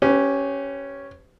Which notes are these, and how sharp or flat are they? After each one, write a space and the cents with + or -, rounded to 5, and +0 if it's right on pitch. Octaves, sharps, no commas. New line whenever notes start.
C#4 +0 G4 +0 B4 +45